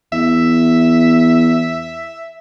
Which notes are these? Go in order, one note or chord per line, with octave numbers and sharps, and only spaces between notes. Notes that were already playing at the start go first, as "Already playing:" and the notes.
E2 E5